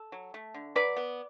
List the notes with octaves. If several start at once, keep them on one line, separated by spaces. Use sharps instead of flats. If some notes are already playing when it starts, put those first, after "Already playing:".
Already playing: A4
F#3
A3
D3
F#3 B4 D5
B3